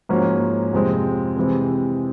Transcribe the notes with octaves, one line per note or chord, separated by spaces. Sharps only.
G#2 F3 A#3 C#4 F#4
F2 C3 F3 G#3 C4
C3 E3 G#3 C4